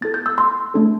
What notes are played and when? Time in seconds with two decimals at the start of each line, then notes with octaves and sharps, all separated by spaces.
0.01 B3 E4 A4 A6
0.14 G6
0.26 E6
0.38 C6
0.74 A3 D4 A4